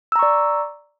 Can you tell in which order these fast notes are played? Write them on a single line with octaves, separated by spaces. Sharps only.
E6 A#5 C#6 D5